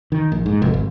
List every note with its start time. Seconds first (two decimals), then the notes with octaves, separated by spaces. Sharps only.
0.12 D#3
0.32 A#1
0.46 G#2
0.62 F1
0.74 G#1